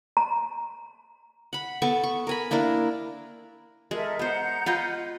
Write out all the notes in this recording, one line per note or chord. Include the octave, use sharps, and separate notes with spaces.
A#5
F#5 B5
B3 A4 A5 C#6
C#6
A#4 G#5 B5
A#3 D4 E4 A#4
G#3 A4 A#4 E5
B3 C5 F#5 A#5 G6
F4 B4 D#5